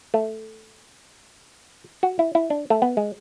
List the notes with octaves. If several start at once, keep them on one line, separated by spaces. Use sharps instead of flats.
A3
F#4
E4
E4
D4
A3
B3
G#3